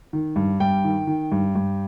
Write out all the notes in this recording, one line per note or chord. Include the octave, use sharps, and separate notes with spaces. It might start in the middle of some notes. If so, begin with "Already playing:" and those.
D#3
G2
G2 G5
D#3
D#3
G2
G2